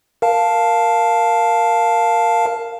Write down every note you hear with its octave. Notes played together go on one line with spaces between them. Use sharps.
A#4 F5 A5